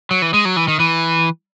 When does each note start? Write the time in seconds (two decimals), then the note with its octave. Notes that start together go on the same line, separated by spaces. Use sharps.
0.11 F#3
0.22 E3
0.34 G#3
0.45 F#3
0.57 E3
0.68 D#3
0.80 E3